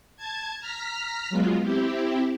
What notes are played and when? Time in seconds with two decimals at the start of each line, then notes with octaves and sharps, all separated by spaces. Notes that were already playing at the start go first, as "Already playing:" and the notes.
0.17 A5 G#6
0.59 A#5 F6 B6
1.30 F#3 G#3 B3 F4
1.61 C4 E4 G4